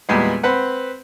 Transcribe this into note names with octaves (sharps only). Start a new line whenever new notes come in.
E2 A#2 G3 G#3 B3
C4 B4 F#5